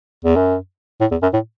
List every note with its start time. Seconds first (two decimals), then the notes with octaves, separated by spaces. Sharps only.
0.25 E2
0.36 F#2
1.01 A2
1.11 E2
1.22 F#2
1.33 A2